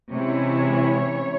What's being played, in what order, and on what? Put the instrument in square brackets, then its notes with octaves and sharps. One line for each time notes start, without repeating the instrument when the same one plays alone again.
[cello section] C3 E3 G#3 C#4 E4 C#5